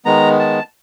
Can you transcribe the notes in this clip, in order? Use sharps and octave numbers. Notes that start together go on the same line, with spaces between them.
D#3 G#3 B3 A#5
A5